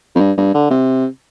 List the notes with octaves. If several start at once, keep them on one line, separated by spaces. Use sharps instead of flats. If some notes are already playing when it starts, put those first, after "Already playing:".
F2
G2
G2
D3
C3